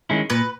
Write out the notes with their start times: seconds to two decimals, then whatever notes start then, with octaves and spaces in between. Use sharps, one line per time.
0.10 D#3 G#3 C#4 E4
0.30 A#2 B4